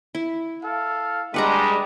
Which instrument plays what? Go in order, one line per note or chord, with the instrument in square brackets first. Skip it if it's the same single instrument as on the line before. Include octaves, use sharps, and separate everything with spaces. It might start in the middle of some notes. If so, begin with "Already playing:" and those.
[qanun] E4
[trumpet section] A4 F5
[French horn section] G3 G#3 [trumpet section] D4 [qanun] B4 F#5 A#5